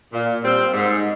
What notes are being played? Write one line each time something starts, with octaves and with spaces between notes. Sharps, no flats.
A#2
G3 C4
G#2